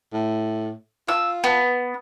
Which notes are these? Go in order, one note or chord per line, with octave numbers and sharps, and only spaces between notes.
A2
F4 E6
B3